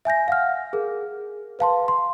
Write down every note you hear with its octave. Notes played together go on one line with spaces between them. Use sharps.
E5 G#5 G6 A#6
F5 F#5 F6
G#4 A#4
B4 F5 A5 C6
C6